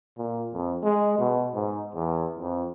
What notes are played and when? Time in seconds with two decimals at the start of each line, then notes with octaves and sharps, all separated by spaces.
0.18 A#2
0.53 F2
0.83 G#3
1.19 B2
1.55 G#2
1.95 E2
2.39 F2